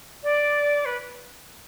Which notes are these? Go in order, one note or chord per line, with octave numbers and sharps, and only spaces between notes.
D5
B4